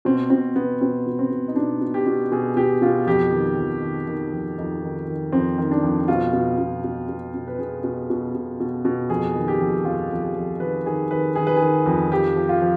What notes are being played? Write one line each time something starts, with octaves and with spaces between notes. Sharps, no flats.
B2 C4
B2 C4
B2 B3
B2 C4
B2
C4
B2
D#4
B2 D4
B2
G4
B2
B2 G#4
B2 G4
B2 F4
F2 G4
D#3
F2
D#3
D#3
F2
F2 D#4
D#3
D#3
F2 C4
D#3
D4
F2
B2 F4
B2
B2
B2
B2
B2
B4
B2 G#4
B2
B2
B2
B2
B2
F2 G#4
D#3
G4
F2
F2 F4
F2
G4
F2
D#3 B4
D#3 G#4
D#3 B4
D#3 G#4
B4
G#4
D#3
F2
F3 G4
F3
F4
F3